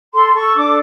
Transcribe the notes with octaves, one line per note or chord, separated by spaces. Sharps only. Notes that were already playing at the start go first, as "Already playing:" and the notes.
A4 C6
A4 C#6
D4 D6